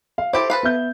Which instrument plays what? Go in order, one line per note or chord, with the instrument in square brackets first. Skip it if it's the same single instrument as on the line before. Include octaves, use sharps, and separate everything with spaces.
[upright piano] F5
[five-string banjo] E4 G4 A4 [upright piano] C5
[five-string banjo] A4 B4 F5
[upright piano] B3 E5 G6